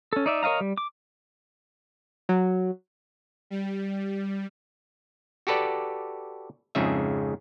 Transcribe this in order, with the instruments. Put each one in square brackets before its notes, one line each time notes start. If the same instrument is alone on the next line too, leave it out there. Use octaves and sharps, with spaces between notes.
[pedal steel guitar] C#4 A4
D#4 D5 E5
A#4 C#5 D#5 F5 A#5
G3
D6
[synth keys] F#3
[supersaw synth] G3
[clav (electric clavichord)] F#4 G4 A4 B4 D5
F2 G#2 C#3 G#4 E5